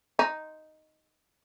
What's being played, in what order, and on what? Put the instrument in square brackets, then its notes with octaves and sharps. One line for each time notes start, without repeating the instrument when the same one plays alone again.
[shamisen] D#4